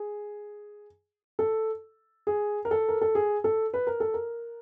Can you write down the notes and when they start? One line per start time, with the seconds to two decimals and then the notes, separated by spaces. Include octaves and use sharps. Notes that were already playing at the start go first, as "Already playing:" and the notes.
Already playing: G#4
1.39 A4
2.27 G#4
2.65 A#4
2.71 A4
2.89 A#4
3.01 A4
3.15 G#4
3.44 A4
3.74 B4
3.87 A#4
4.00 A4
4.14 A#4